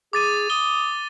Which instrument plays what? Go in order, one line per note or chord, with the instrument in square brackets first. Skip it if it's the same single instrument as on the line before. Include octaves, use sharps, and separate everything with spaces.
[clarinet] G#4 [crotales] D6 A6 D#7
[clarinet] D#6 [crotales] G7